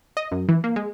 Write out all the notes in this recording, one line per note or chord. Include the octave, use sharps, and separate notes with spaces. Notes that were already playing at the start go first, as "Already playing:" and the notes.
D#5
F#2
E3
A#3
G#3